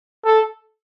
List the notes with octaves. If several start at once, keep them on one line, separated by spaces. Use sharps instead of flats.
A4